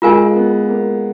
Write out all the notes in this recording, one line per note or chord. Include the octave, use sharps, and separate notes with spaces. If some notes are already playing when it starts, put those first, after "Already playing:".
G#3 F4 A#4 F5 G#5
B3
A#3